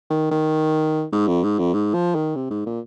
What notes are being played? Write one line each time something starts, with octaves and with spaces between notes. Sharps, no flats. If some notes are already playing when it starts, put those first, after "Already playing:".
D#3
D#3
G#2
F2
G#2
F2
G#2
F3
D#3
C3
G#2
A#2